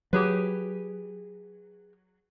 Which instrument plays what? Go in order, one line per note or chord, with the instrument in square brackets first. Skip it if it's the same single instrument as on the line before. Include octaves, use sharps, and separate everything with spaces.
[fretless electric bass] F#3 [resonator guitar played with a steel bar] G4 G#4 B4